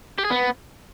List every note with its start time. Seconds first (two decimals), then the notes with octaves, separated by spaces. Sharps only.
0.18 G4
0.25 G#4
0.31 B3